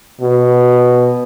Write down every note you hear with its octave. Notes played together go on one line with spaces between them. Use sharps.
B2